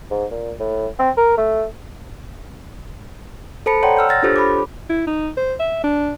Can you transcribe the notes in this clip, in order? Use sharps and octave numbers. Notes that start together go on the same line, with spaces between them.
G#2
A#2
A2
C4
A#4
A3
A4 C5 A5 B5 C#7
C#5 D5 F#5 G5 A#5 C6
E6 F6 G6
F6 A6 A#6
D4 F4 G4 A4 C5 C#5
B5 D6
E4
D#4
C5
E5
D4